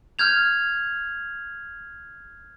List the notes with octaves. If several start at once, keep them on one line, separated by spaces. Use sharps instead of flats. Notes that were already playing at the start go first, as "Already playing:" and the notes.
F6 G6 G#6 F7